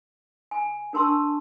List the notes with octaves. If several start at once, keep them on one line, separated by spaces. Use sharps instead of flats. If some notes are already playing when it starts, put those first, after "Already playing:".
G#5
D4 A#4 A5 C6 C#6 E6